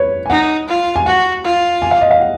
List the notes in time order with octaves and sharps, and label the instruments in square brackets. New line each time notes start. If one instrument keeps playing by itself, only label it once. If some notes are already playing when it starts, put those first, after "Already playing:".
Already playing: [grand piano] B4 C#5
G#5
[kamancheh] D#4 [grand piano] F#5
[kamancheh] F4
[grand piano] G#5
[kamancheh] F#4 [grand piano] F#5
[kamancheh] F4
[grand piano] G#5
F5
D#5
F5
F#5